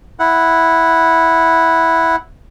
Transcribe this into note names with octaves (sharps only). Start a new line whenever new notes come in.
E4 F#5